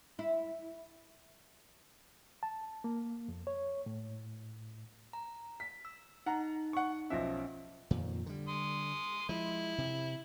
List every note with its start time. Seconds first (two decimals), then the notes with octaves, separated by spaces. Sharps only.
0.19 E4
2.43 A5
2.84 A#3
3.29 F2
3.47 C#5
3.86 A2
5.13 A#5
5.60 B6
5.85 E6
6.26 D#4 F#5 A#5
6.73 F#5 C#6
7.10 B1 F3 C#4 E5 A#6
7.91 F2 A#2 D#3
8.26 D3 G3
8.48 C6 D#6
9.29 F3 G#3 E4
9.78 C3